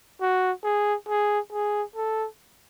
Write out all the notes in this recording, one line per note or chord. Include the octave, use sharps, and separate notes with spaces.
F#4
G#4
G#4
G#4
A4